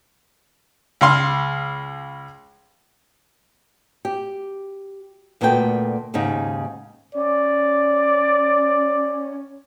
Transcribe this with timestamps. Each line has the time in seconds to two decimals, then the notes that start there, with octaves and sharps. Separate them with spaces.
1.01 C#2 F5 C6
4.05 G4
5.41 D2 A#2 A3 B3 A4 G5
6.14 D#2 G#2 C#3 D#4
7.15 C#4 D5